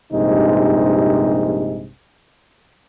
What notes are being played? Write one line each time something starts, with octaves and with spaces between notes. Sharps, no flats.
A#1 G2 C3 G#3 D#4